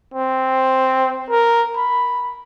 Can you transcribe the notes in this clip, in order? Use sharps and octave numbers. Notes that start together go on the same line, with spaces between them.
C4
A#4
B5